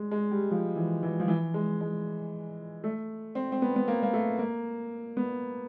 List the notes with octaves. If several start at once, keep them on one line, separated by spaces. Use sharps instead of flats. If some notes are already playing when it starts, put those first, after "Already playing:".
Already playing: G#3
G#3
G3
F3
E3
E3
F3
E3
G#3
G#3
A3
C4
C4
B3
B3
A#3
A#3
A3
A#3
B3